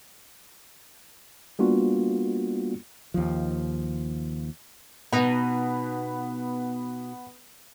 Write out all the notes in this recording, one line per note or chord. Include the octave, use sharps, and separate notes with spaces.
G3 A#3 B3 D4 F4 F#4
D#2 F3
B2 B3 D#4